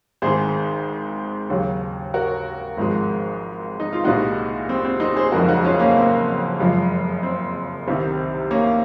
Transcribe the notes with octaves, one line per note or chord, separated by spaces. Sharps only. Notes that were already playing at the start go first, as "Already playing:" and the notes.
G#1 G#2 D#3 G#4 C5
D#2 C#3 F#3
F#4 A#4
G#1 G#2 F3 G#3
D#4
F4
C2 A#2 G#3 D#4 F#4
C4
C4
C4 D#4
G#4 C5
F#1 F2 C#3 G#3 F#4 A#4
D#4 F#4
C#4 F4
A#3 C#4
C4
F#1 F#2 F3 G#3
C4
C2 C3 D#3
A#3 C#4